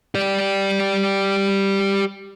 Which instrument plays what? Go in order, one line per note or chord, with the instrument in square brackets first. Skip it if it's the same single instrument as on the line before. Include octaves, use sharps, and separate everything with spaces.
[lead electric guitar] G4 D5